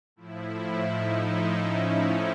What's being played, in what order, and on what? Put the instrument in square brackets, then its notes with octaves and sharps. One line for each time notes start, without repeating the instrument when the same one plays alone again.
[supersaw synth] A2 F3 E4
D#4
C#4